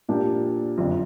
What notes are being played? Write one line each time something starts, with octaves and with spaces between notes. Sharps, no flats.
A#2 F3 A#3 D4 G4
F#1 F2 D3